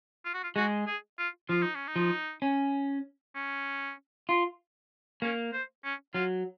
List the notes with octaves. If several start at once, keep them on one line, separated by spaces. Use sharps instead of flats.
F4
F#4
F4
G#3 F#4
G#4
F4
F3 F4
D#4
C#4
D#4
F3
C#4
C#4
F4
A#3 C#4
C5
C#4
F#3 F4